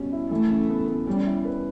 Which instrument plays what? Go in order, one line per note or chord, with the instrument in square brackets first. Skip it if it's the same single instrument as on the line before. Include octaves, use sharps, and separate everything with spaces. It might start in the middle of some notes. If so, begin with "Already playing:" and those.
Already playing: [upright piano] B2 G3 C#4
E4
[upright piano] E3 [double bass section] A3
[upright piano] C#3
B3
B3
[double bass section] G3 [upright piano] C#4
[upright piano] E4
B4